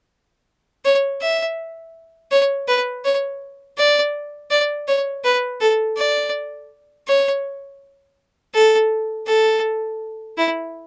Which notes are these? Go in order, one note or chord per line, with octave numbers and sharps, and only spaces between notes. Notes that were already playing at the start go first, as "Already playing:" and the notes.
C#5
E5
C#5
B4
C#5
D5
D5
C#5
B4
A4
D5
C#5
A4
A4
E4